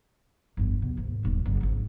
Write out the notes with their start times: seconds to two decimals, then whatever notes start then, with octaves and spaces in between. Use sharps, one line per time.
0.57 G1 F2
0.82 B2
0.97 D#2 G#2
1.23 D#1 B1
1.45 F#1
1.61 G#1 G#2